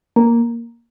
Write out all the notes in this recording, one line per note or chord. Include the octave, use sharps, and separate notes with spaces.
A#3